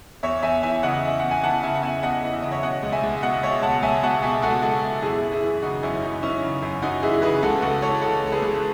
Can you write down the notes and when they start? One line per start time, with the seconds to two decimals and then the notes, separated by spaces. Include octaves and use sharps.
0.23 E2 C#5 E5
0.43 E2 E5 G#5
0.63 E3 E5 G#5
0.83 C#3 D#5 F#5
1.04 E2 E5
1.20 E2 F#5
1.31 G#5
1.43 E3 F#5 A5
1.63 C#3 E5 G#5
1.75 F#5
1.82 E2 E5 G#5
2.03 E2 D#5 F#5
2.23 E3
2.33 E5
2.42 C#3 D#5
2.52 C#5 E5
2.63 B2 D#5 F#5
2.83 C#2
2.92 E5 G#5
3.03 C#2
3.22 B2 D#5 F#5
3.43 B2 C#5 E5
3.62 C#2 F#5 A5
3.82 C#2 E5 G#5
4.03 B2 F#5 A5
4.23 B2 E5 G#5
4.42 C#2 F#4 A4
4.62 C#2 F#4 A4
4.83 B2
5.02 F#2 E4 G#4
5.23 F#2
5.32 E4 G#4
5.42 E3
5.62 C#3 D#4 F#4
5.83 F#2 C#4 E4
6.02 F#2 D#4
6.22 E3 C#4 E4
6.42 C#3
6.62 F#2
6.82 F#2 D#4 F#4
7.02 E3 E4 G#4
7.22 C#3 G#4 B4
7.43 C#2 F#4 A4
7.62 C#2 F#4 A4
7.82 E3 A4 C#5
8.02 C#3 F#4 A4
8.23 C#2 A4
8.32 G#4 B4
8.42 C#2